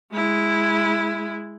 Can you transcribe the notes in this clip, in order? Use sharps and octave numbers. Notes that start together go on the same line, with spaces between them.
G#3 E4